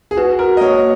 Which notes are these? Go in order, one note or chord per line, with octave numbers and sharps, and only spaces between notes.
G#4
F#4 B4
F#4 A#4
D#5
A#3 C#5